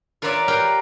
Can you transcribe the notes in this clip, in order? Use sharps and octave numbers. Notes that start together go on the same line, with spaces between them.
F4 A#4 B4 C#5 D5 E5
G4 A#4 B4 F5 G5